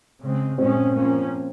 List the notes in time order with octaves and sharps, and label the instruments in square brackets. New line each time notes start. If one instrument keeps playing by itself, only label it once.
[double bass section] C#3 G#3 C4
[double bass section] A#2 F3 G#3 C#4 [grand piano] C4
[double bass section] F3 A#3 C#4